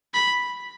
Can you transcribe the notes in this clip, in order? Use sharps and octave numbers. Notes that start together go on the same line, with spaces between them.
B5